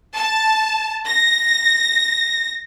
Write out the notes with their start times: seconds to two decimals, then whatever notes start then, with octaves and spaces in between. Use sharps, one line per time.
0.15 A5
1.06 A#6